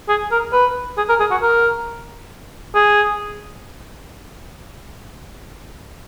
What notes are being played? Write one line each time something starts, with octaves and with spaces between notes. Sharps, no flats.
G#4
A#4
B4
G#4
A#4
G#4
F#4
A#4
G#4